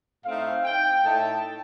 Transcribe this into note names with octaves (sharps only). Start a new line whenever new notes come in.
A2 A3 C4 D#4 F5
G5
A2 A3 D#4 A5